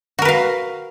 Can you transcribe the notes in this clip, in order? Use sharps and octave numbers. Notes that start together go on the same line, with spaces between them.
F#4 A#4 B4 F5